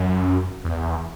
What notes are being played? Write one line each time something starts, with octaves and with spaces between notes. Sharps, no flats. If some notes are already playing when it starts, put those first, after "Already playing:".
Already playing: F#2
E2